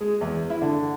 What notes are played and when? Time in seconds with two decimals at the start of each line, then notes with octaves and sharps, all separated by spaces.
0.01 G#3
0.21 E2
0.50 E4
0.62 D3